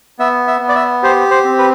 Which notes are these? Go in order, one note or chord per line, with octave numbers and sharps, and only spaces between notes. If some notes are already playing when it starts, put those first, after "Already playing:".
B3 E5
E5
B3
D5
E5
G4 C5
C5
C4
B4